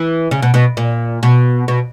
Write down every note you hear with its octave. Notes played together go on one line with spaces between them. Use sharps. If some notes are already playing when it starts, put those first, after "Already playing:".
Already playing: E3
C#3
B2
B2
A#2
B2
B2